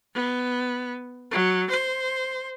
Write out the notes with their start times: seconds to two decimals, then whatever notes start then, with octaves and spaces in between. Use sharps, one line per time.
0.14 B3
1.31 F#3
1.70 C5